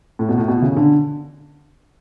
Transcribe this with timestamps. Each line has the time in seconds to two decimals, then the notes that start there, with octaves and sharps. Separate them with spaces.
0.19 A2
0.29 B2
0.38 A2
0.48 B2
0.62 C#3
0.76 D3